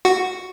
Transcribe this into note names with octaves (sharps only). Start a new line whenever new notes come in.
F#4